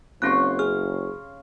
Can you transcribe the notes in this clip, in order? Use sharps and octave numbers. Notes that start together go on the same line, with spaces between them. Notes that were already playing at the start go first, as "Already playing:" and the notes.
F#1 C#3 C4 C#4 C6 C#6 F#6
G#4 F6